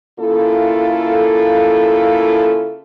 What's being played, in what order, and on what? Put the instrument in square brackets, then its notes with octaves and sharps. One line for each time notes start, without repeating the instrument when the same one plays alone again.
[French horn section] C#3 A#3 E4 F4 A4